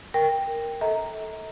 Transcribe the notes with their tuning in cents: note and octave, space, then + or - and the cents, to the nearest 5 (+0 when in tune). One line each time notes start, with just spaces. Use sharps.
A#4 +0 G5 +10
A4 +0 E5 -45 A#5 -10